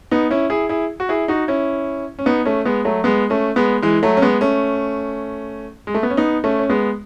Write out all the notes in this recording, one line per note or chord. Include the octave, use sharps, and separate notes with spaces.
B3 D#4
C#4 E4
E4 G#4
E4 G#4
F#4
E4 G#4
D#4 F#4
C#4 E4
C#4
B3 D#4
A3 C#4
G#3 B3
F#3 A3
G#3 B3
A3 C#4
G#3 B3
E3 G#3
F#3 A3
C#4
G#3 B3
A3 C#4
G#3
A3
B3
C#4
B3 D#4
A3 C#4
C#4
G#3 B3